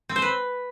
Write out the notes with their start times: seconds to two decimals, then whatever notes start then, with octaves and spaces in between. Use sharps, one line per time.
0.09 C4
0.16 C5
0.22 B4